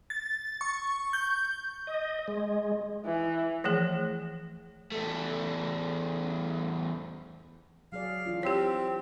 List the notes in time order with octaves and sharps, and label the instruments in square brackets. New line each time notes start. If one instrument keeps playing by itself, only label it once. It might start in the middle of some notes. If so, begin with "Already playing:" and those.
[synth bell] A6
C#6
G6
[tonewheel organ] D#5
G#3
[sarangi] E3
[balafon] E3 F3 A3 G#4
[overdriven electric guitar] E2 A3
[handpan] F#3 G#4 D5 [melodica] F5
[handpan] E3 D4 F4
[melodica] C4 [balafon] G4 C#5